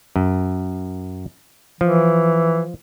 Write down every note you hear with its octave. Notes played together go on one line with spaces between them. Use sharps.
F#2
E3 F3